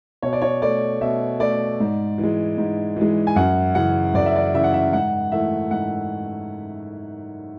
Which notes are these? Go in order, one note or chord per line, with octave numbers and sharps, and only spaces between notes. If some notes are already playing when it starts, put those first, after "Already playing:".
B2 C#5
D5
C#5
A3 D5
B2 E5
A3 D5
G#2
E3
G#3
G#2
E3 G#3
G#5
F#2 F#5
C#3 E3 F#5
F#2 D5
E5
D5
C#3 E3 E5
F#5
E5
G#2 F#5
E3 A3 E5
G#2 F#5